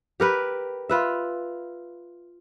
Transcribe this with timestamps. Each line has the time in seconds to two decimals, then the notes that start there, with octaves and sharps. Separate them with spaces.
0.20 G4 A#4 B4
0.89 F4 B4 E5